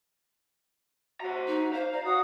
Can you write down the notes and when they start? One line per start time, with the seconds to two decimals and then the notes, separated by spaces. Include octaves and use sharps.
1.20 F#4 C5 A#5
1.47 D#4
1.73 C5 F5
1.93 D5 A#5
2.04 F#4 D#6